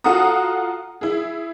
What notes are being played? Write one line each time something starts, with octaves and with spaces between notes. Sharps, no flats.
F4 F#4 A4 F#5 A#5 D#6
E4 G#4